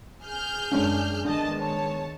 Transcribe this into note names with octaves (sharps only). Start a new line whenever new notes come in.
G#4 F6 G6
F#2 G#3 C#4 D4
D#3 G#3 B3 D4 D#5 A5
C#5 A5